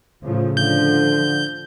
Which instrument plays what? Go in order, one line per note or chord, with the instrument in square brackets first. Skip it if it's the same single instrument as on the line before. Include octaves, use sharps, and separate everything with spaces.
[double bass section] A2 C#3 F3
[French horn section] D3 [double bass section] F3 [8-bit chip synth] G6